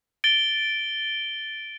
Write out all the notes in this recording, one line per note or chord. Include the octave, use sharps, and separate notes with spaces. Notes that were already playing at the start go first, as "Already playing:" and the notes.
A6 D7 G7